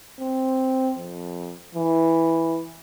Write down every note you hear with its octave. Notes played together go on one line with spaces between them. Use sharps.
C4
F2
E3